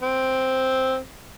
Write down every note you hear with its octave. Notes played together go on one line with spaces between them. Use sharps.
C4